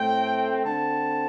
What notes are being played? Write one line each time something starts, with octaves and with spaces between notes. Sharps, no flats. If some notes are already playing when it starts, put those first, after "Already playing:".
Already playing: A2 A3 C4 G5
D3 C4 A5